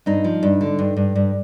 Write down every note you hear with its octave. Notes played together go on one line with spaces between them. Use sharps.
G2 D#4
F3
G2
D3
G2
G2
G2